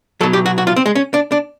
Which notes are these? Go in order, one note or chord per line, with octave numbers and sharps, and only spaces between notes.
B2 F#3 A4
G4
F#4
F#4
F4
C4
G#3
C#4
D4
D4